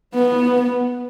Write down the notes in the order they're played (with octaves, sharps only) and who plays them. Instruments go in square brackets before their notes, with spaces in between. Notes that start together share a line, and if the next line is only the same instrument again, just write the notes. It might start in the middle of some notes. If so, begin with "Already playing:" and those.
[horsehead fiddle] B3